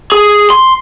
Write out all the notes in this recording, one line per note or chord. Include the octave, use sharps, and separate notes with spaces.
G#4
C6